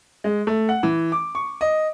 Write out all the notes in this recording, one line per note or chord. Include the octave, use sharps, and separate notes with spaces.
G#3
A3
F#5
E3
D6
C#6
D#5